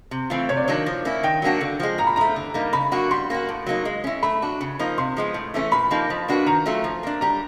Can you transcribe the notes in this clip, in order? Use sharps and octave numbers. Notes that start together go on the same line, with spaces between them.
C3
E3 A3 C4 F4
C3 C#5
D5
D#3 F#3 A#3 D4 C#5
F3
A#3 C#4 E4
D#3 G5
F#3 A#3 D4 F#4
D3
F3 G#3
A#2 A#5
B5
F3 A3 A#5
D3
G3 A#3 D#4
C#3 B5
F#3 A#3 D4 F#4
G3 C6
A#3 C#4 F#4
A2
F#3 A#3 D#4
G#3
C#4 E4
A3 B5
D4 F#4
C#3
F3 A#3 D#4
C3 C6
F3 G#3 B3
A2
E3 A3 C#4
A#2 B5
F3 A#3 D#4 G4
F3
A#3 D4 F#4 B4
D#3 A#5
F#3 A3 C#4 F4
F3
A#3 D4
G3 A#5